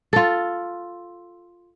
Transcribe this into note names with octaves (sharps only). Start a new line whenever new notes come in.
F4 A4